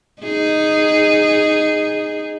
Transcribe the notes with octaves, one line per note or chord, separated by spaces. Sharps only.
D#4 G#4